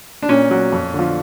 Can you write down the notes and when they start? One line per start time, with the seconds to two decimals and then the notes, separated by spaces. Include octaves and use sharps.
0.22 D4
0.29 A#2 C#4
0.51 F#3
0.72 F2
0.94 D3 F3